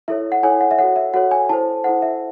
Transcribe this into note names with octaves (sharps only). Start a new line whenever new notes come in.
E4 A4 C#5 E5
F#5
E4 A4 C#5 G#5
F#5
E5
F#4 A4 C#5 F#5
E5
F#4 A4 C#5 F#5
G#5
E4 A4 C5 A5
E4 A4 C5 F#5
E5